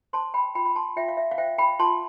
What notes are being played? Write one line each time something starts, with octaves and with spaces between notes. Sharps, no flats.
C5 A5 C6
G5 B5
F4 G5 B5
B5
A5 C6
F4 E5 G5
F5
E5
F5
C5 E5 G5
G5 B5
F4 A5 C6